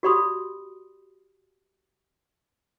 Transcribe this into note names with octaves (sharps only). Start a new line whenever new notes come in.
F#4 G4 D5 B5 C6 D#6